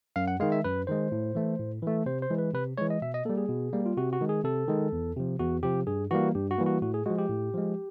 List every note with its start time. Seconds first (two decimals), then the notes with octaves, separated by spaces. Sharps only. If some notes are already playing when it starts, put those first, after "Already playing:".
0.16 F#2 F5
0.28 F#5
0.40 D#3 G#3 F5
0.52 E5
0.64 F#2 B4
0.87 D#3 G#3 C5
1.12 A2
1.35 E3 A3
1.59 A2
1.82 E3 A3
2.06 C3 C5
2.22 C5
2.30 E3 G#3
2.38 B4
2.54 C3 B4
2.78 E3 G#3 C#5
2.90 D#5
3.02 B2 E5
3.14 D#5
3.25 A#3 A4
3.29 G3
3.38 G#4
3.49 B2
3.73 G3 A#3
3.86 F4
3.97 C3 F#4
4.13 F#4
4.21 D#3 G#3
4.29 G#4
4.44 C3 A4
4.68 D#3 G#3
4.92 E2
5.16 C3 F3
5.39 E2 F#4
5.63 C3 F3 G4
5.87 G2 G#4
6.11 E3 G3 A#3 F#4
6.35 G2 G4
6.51 F#4
6.58 E3 G3 A#3
6.66 F#4
6.82 A2 F#4
6.94 G#4
7.06 F3 G#3 F#4
7.19 G4
7.30 A2
7.54 F3 G#3